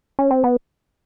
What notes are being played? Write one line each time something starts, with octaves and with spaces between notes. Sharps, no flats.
C#4
C4
B3